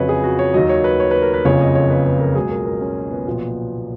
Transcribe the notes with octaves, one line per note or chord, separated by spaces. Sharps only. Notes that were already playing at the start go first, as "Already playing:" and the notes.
Already playing: F2 C#3 F#3 B4 C#5 D#5
G#4
F#4
C#5
D#2 D#3 F#3 D#5
C#5
B4
C#5
B4
A#4
B4
F#1 F2 C#3 F3 C#5
D#5
C#5
B4
B4
A#4
C#2 B2 F#3 G#4
A#4
A#4
C#4
B3
B1 A#2 F3